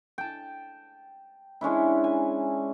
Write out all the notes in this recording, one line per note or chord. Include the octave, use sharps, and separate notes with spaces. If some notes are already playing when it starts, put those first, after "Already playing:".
G5 A5
G#3 C#4 D4 E4
G#5